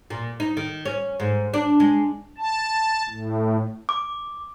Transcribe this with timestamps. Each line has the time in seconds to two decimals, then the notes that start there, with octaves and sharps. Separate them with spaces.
0.10 A#2
0.40 D#4
0.57 D#3
0.85 C#4
1.20 G#2
1.54 D4
1.80 G#3
2.38 A5
3.09 A2
3.89 D6